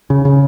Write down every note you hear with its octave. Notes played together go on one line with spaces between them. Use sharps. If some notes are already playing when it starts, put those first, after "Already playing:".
C#3
C#3